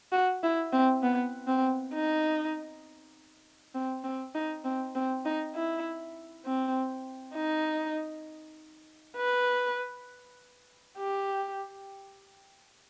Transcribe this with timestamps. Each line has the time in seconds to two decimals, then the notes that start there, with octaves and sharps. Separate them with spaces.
0.12 F#4
0.43 E4
0.72 C4
1.03 B3
1.47 C4
1.93 D#4
3.74 C4
4.04 C4
4.35 D#4
4.64 C4
4.95 C4
5.25 D#4
5.55 E4
6.45 C4
7.36 D#4
9.17 B4
10.98 G4